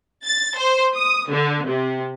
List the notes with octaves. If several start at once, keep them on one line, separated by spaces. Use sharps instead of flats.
A6
C5
D#6
D3
C3